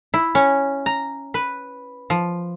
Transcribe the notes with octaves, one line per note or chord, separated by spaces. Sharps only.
E4
C#4
A#5
B4
F3